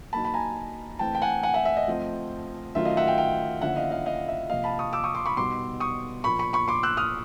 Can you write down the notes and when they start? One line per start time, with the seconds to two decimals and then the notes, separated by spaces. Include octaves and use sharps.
0.13 F#3 A#3 D#4 A5 B5
0.25 B5
0.34 G#5 A#5
0.99 E3 A3 C4 G5 A5
1.15 G5
1.22 F#5 G#5
1.43 F#5 G#5
1.54 E5 F#5
1.65 E5
1.77 D#5
1.88 F3 A3 C4 F4
2.75 D#3 F#3 A3 C#4 F4 E5
2.85 D#5 F5
2.97 E5 F#5
3.07 F5 G5
3.18 F5 G5
3.62 D3 F3 A#3 C#4 E4 E5 F#5
3.76 D#5 F5
3.91 D#5 F5
4.06 D#5 F5
4.28 E5
4.49 C3 F3 A#3 D#5 F5
4.64 A5 B5
4.79 C#6 D#6
4.93 D6 E6
5.04 C#6 D#6
5.15 C6 D6
5.26 B5 C#6
5.37 B2 G3 B3 D#4 C6 D6
5.80 C#6 D#6
6.24 A#2 F3 A#3 B5 C#6
6.39 B5 C#6
6.53 B5 C#6
6.68 C6 D6
6.83 E6 F#6
6.97 D#6 F6